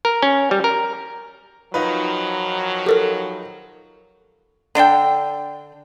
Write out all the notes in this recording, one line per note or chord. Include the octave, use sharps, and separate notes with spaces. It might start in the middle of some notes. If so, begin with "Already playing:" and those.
A#4
C#4
G3
A#4
D#3 F3 F#3 D#4 F4 B4
G4 A4 A#4
D3 D4 A4 G5